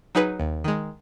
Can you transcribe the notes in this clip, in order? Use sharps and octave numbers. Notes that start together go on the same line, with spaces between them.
F#3 D#4 G#4 B4
D#2
D#3 G#3